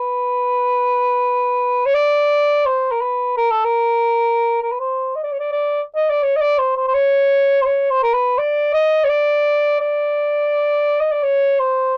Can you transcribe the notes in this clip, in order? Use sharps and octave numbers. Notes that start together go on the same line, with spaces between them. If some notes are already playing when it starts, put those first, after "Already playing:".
Already playing: B4
C#5
D5
C5
A#4
B4
A#4
A4
A#4
A#4
B4
C5
D#5
D5
C#5
D5
D5
D#5
D5
C#5
D#5
D5
C5
C5
C5
C#5
C5
C#5
C5
A#4
B4
D5
D#5
C#5
D5
D5
D#5
D5
C#5
C5